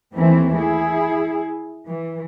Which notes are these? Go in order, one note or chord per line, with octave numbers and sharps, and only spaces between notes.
D#2 E3 A3 C4 E4
E4 G#4
E3